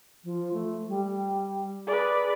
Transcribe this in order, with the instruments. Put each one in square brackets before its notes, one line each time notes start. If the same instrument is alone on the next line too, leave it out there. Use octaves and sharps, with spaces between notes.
[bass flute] F3
A3
G3
[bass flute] G#4 [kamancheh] B4 D5